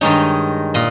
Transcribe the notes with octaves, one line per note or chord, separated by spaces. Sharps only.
G2 D#3 G#3 D#4 C#5
A#2 D#5